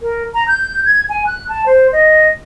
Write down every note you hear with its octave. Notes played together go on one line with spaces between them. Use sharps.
A#4
A#5
G6
G#6
G#5
F#6
A5
C5
D#5